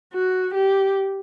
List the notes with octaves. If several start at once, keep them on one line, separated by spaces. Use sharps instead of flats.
F#4
G4